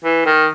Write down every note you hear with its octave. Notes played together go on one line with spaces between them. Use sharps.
E3
D#3